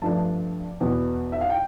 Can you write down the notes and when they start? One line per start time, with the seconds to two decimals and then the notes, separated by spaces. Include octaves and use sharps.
0.02 G2 F3 A3 D4 A5
0.80 E2 B2 B3
1.32 E5
1.41 F5
1.50 G5